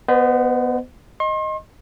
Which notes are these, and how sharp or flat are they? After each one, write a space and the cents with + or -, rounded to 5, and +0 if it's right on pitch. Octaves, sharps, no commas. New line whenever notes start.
B3 +0 C5 -40 D#5 -35
D#5 +0 C6 +40